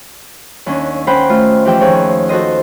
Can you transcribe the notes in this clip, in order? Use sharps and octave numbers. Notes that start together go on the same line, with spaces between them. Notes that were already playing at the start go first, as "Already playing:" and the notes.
D#2 C#4 D4
C#4 D#4 C5 F#5 G5 B5
A3 F4
E3 F3 G4 G5 E6
D#2 F3 G#4 C#5
F#4 A4 C5 D#5